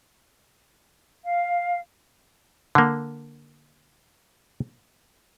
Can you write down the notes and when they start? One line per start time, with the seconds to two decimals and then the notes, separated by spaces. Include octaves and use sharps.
1.24 F5
2.75 D3 A#3